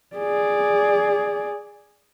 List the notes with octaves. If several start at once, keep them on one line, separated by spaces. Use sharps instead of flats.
G#4 D5